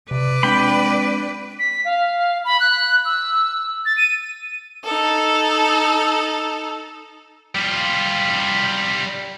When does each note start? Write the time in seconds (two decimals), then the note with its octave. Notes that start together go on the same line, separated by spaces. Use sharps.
0.11 C3 B4 D5
0.43 G#3 C4 D4 G5 B5
1.59 B6
1.85 F5
2.45 B5
2.60 F#6
3.05 E6
3.85 A6
3.97 D#7
4.84 D#4 A4
7.55 G3 F4